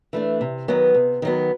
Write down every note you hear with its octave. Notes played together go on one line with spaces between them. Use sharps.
E3 A3 D4
C3
D#3 F#3 B3
C3
D#3 F#3 B3